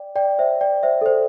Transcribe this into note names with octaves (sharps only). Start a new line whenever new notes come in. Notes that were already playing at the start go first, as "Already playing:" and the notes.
Already playing: D5 G5
D5 G5
C5 E5
D5 G5
C5 E5
A4
C5